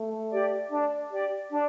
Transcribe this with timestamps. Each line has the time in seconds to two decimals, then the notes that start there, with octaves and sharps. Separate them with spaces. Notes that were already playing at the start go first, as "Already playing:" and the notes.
Already playing: A3
0.30 G4 D5
0.70 D4
1.10 G4 D5
1.50 D4